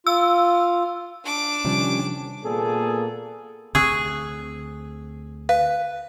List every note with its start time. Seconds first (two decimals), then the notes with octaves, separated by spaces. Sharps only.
0.07 F4 E6
1.24 D4 D6
1.65 C3 D#3 F3 G3 C#4
2.44 A#2 A#3 B3 G#4 A4
3.75 D2 D3 C4 G#4 C#6 E6 F#6
5.49 B4 F5